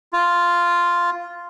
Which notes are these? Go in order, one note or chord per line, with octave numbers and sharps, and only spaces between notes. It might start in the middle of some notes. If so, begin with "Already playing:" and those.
F4